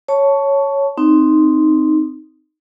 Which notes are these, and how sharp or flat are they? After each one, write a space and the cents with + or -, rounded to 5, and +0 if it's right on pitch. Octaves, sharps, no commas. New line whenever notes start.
C#5 +0 A5 +0 C#6 +15
C4 +0 D#4 -5